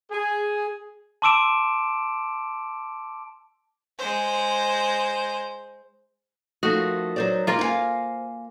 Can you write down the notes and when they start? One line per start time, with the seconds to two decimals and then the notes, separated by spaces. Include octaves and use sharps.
0.11 G#4
1.22 A5 C6 D6 E6 D7 E7
3.99 G#3 C5
6.63 F3 A3 D#4 F4 F#4 A#4
7.16 F#3 C5 D5
7.47 A#3 F4 A#4 C5
7.59 E4 F5 G#5